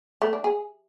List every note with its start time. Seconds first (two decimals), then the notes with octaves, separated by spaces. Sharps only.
0.22 A3
0.33 D4
0.44 G#4